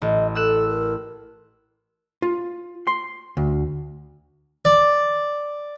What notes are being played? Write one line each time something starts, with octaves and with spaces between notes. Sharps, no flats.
A1 D#5
A4 E6 F#6 E7
A#4
F4
C6
D2
D5